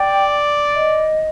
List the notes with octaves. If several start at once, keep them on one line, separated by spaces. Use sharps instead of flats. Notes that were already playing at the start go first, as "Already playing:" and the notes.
Already playing: D5 G5
D#5